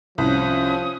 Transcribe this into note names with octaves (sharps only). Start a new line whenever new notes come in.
C2 F3 C#4 D#6